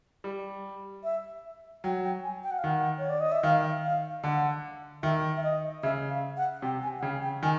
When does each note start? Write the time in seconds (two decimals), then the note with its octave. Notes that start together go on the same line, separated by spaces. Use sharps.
0.24 G3
1.04 E5
1.84 F#3 G5
2.03 G5
2.23 G#5
2.43 G5
2.51 F#5
2.59 F5
2.64 D#3 F#5
2.99 C#5
3.09 D5
3.20 D#5
3.32 E5
3.43 D#3 F5
3.84 F5
4.23 D3 F#5
5.03 D#3 E5
5.36 E5
5.43 D#5
5.83 C#3 E5
6.10 F5
6.37 F#5
6.62 C3 G5
6.83 G#5
6.98 F#5
7.02 C#3 G5
7.22 G5
7.43 D#3 G#5